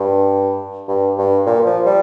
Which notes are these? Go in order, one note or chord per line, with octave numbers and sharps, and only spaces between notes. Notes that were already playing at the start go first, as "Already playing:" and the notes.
Already playing: G2
G2
G2
A#2
F3
G3